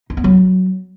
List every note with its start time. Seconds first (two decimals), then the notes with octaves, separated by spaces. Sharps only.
0.10 D#4
0.17 B3
0.24 F#3